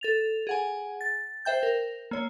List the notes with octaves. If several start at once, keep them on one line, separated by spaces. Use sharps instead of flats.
A4 A6 F7
G#4 F#5 G#5
A6
C5 E5 G5 G6
A#4
A#3 C#5